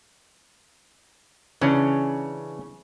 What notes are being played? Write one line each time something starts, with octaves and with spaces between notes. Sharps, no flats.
C#3 E3 C#4 D4